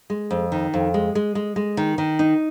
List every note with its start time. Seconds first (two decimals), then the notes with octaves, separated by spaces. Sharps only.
0.10 G#3
0.31 F2
0.52 D#3
0.74 F2
0.94 G#3
1.15 G#3
1.35 G#3
1.56 G#3
1.77 D#3
1.98 D#3
2.19 D#4